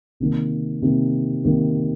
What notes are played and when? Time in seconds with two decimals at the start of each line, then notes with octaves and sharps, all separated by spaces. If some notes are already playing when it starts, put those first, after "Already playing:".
0.20 C3 D#3 A#3
0.82 C3 D#3 A#3
1.45 C3 D#3 A#3